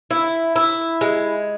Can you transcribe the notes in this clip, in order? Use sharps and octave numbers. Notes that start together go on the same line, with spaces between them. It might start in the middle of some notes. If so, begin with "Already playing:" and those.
E4
E4
G#3